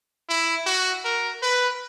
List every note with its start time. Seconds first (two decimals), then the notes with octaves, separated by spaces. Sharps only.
0.29 E4
0.67 F#4
1.05 A#4
1.42 B4